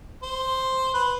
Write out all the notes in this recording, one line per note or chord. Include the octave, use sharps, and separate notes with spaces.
C5
B4